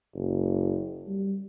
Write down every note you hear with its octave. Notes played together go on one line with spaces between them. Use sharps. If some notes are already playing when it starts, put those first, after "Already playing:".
F#1
G3